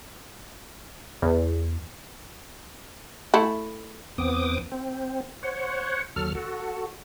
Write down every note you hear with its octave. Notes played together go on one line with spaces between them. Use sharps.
E2
A3 E4
E2 B3 C4 D6 D#6
C4
C5 C#5 F#5
D#2 F#3 A4 F6
F#4 A4